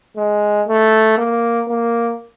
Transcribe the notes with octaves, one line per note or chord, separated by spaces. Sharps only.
G#3
A3
A#3
A#3